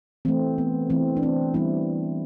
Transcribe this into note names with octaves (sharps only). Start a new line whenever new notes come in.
E3 A3 C4
B3
E3 A3 C4
D4
C4
E3 G3 B3 C4 E4